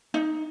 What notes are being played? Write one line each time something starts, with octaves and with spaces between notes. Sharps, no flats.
D#4